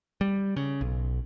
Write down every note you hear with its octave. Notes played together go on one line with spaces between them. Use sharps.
G3
C#3
B1